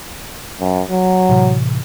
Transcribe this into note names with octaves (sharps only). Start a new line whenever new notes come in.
F#2
F#3
A2 C3 E3